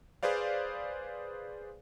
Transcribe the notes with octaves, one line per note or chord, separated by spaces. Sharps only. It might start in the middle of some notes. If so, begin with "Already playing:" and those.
G#4 B4 C5 D5 F5